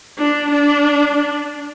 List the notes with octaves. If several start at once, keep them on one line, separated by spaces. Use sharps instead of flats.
D4
D4